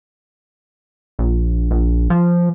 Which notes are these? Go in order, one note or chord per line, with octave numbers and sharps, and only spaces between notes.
A#1
A#1
F3